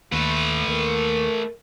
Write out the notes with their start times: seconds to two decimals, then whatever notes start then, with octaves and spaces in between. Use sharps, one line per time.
0.12 D#2 A3 B4
0.68 D#2 A#4